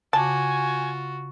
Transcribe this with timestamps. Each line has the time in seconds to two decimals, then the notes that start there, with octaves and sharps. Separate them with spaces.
0.13 C#3 F4 F#4 G#5 A5 D6